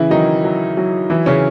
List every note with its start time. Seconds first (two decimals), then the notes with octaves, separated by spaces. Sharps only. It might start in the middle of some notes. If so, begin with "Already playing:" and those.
Already playing: C#3 E3 E4
0.10 D#3 F#3 D#4
0.44 F#3
0.77 F#3
1.10 E3 E4
1.26 C#3 C#4